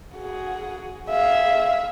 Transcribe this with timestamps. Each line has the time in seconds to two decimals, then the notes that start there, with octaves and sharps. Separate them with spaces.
0.15 F#4 G#4
1.10 G#4 E5 F5